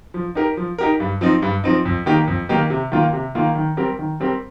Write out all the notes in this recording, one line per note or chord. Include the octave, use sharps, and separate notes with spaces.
F3
D#4 G4 A#4
F3
D#4 G4 A#4
G2
F3 C4 D#4
G2
F3 C4 D#4
F2
D#3 A#3 D#4 G4
F2
D#3 A#3 D#4 G4
C3
D#3 A#3 F4
C3
D#3 A#3 F4
D#3
G3 C4 G4 A#4
D#3
G3 C4 G4 A#4